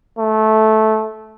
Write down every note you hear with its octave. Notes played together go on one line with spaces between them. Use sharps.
A3